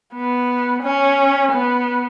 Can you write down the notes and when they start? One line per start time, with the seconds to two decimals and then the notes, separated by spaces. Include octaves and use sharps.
0.14 B3
0.82 C#4
1.51 B3